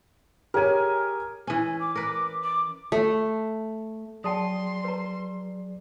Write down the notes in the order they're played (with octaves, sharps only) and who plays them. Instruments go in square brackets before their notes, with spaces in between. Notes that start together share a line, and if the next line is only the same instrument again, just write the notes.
[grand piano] G4 G#4 C#5 [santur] A#4 G#5
[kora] E3 C#4
[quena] D6
[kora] A#4 B4 [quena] D6
[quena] D6
[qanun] A3
[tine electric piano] F#3 G#4 D5 [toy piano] G5 A5 D#6 [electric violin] C6
[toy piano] B4 A#5